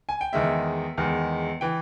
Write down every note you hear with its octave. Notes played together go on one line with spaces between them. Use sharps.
G#5
G5
E2 D#3 G#3 E5
E2 D#3 G#3
E3 G5